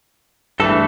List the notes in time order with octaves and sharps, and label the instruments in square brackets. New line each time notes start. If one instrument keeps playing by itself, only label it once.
[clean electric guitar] G2 E3 A3 A4